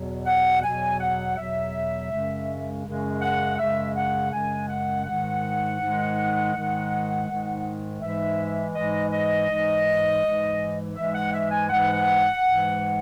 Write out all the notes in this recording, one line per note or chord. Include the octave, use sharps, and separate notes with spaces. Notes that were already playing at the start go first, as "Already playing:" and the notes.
Already playing: E2 B2 F#3
F#5
E2 B2 F#3 G#5
F#5
E2 B2 F#3 E5
F#2 C#3 G#3
F#2 C#3 G#3
F#5
F#2 C#3 G#3 E5
F#5
F#2 C#3 G#3 G#5
F#5
G#2 D#3 G#3 F#5
G#2 D#3 G#3
G#2 D#3 G#3
G#2 D#3 G#3
G#2 E3 G#3 E5
G#2 E3 G#3 D#5
D#5
G#2 E3 G#3
G#2 E3 G#3
G#2 E3 G#3 E5
F#5
E5
G#5
G#2 E3 G#3 F#5
G#2 E3 G#3